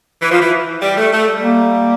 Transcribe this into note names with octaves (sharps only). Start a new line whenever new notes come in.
E3
F3
E3
G3
A3
A3
G3
A#3